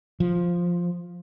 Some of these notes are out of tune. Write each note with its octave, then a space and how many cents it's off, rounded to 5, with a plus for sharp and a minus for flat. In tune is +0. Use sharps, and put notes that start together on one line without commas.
F3 +0